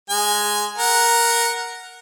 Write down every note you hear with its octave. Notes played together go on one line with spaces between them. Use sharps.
G#3 G#5
A#4 F#5